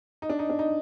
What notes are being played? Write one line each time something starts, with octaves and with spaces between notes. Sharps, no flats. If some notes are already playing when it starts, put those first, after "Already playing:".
D#4
D4
D#4
D4
D#4